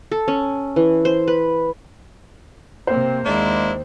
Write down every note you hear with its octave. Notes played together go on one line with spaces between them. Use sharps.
A4
C#4
E3
C5
B4
C3 A#3 C4 C5
D#2 G#3 A#3 D4 E4